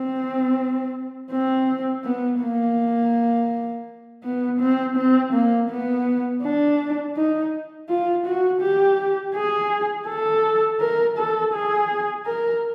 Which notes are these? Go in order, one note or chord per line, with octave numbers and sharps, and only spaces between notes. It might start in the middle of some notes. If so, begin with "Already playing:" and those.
Already playing: C4
C4
B3
A#3
B3
C4
C4
A#3
B3
D4
D#4
F4
F#4
G4
G#4
A4
A#4
A4
G#4
A#4